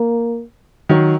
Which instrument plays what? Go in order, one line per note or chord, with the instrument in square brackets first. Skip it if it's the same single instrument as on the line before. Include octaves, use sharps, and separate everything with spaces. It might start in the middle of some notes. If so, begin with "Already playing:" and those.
Already playing: [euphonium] A#3
[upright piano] D#3 F#3